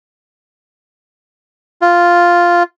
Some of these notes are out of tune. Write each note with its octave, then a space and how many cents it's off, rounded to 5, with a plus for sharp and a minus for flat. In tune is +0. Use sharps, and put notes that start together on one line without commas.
F4 +0